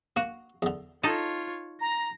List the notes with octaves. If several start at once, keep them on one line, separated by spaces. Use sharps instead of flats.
A#3 F#4
E2 D3
D#4 F4 A4 C#5
A#5 A#6